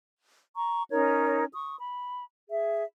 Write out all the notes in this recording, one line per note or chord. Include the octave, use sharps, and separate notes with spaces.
A#5 C#6
C#4 D#4 A#4 C#5
C#6 D#6
B5
G#4 E5